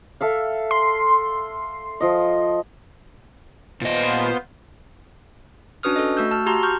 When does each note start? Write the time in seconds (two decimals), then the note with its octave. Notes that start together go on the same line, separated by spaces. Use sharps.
0.21 A4 E5 F5
0.71 C6
2.00 F3 D#5
3.81 A#2 B3 F4 C5 D#5
5.83 C#4 D4 F#4 B4 D#6 F6
5.96 A4 D#5
6.17 A3 F#4 E6 G6
6.31 A5 E6 F6
6.46 F#4 G4 A5 A#5 C6
6.63 C#6 F6 G6